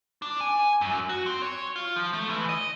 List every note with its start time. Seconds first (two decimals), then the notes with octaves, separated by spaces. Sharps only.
0.22 D4
0.41 G#5
0.81 F#2
1.09 F#4
1.26 C4
1.42 C#5
1.76 F4
1.96 F3
2.13 A3
2.29 E3
2.49 D#5